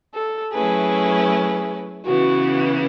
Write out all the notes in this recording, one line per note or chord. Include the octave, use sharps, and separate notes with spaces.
A4
F#3 A3 C#4 E4 G#4 B4
C#3 E3 B3 E4 F#4